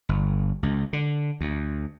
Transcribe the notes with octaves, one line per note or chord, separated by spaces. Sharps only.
G1
C#2
D3
D2